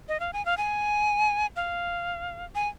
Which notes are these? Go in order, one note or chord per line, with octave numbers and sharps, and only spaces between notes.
D#5
F5
G#5
F5
G#5
F5
G#5